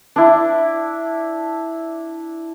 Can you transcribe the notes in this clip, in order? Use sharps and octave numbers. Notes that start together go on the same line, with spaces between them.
D4 E4